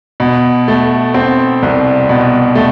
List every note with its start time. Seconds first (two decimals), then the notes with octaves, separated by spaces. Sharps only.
0.20 B2
0.68 A3
1.14 C4
1.62 C2
2.09 B2
2.55 A3